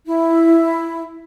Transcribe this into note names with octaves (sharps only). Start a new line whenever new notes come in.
E4